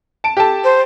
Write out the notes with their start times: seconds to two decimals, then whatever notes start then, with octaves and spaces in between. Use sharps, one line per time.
0.24 A5 D7
0.37 G4 A4 A5
0.64 C5